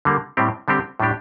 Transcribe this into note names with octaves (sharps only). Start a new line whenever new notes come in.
D3 G3 A#3
A2 G3 C4 G4
D3 G3 C4 G4
A2 G3 D4 G4